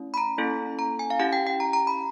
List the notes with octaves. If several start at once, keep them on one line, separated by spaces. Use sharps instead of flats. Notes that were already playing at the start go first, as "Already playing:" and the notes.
Already playing: A3 C#4 E4
B5
A#5
A#3 C#4 E4 A4
A#5
G#5
F5
C#4 E4 G4 F#5
G5
G5
A#5
A#5
B5